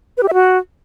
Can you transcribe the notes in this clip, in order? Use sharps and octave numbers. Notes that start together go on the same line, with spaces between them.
B4
G4
E5
F#4